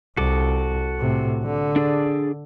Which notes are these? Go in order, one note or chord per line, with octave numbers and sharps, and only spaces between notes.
C2 F#4 A4 D6
A2 C3
D3
D4 G#4 D5